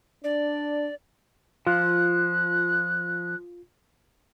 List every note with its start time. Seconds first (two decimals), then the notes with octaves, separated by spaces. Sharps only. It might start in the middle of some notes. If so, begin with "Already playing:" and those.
0.24 D4 D5
1.67 F3 F4 F#6